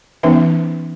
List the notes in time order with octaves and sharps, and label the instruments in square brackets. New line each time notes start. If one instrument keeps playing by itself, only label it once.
[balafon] E3 B3 C#4 D#4 B4 E5